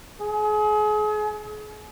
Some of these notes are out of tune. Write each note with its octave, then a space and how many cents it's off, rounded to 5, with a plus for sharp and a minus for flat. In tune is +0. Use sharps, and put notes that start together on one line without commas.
G#4 +35